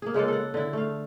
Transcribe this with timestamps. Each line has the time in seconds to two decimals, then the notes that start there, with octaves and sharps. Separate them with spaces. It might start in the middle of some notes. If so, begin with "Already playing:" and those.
0.02 A#3 G#4
0.14 C#3 G#3 A#3 A4
0.28 A4 F#5
0.54 D3 E4
0.73 A3 F5